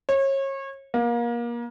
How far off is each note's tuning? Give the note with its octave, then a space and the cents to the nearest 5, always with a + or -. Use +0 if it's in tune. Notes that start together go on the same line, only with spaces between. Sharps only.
C#5 -30
A#3 +30